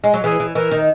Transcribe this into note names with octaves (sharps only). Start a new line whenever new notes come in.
G#3
F#3
E3 G#4
E3
E3 A#4
D#3